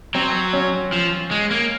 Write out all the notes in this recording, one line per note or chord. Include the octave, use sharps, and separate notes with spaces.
F#3 C4
C#4
F3
G#3
A#3